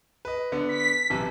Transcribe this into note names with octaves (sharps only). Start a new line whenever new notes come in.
B4 D#5
D3 B3
B6
B1 C3 E3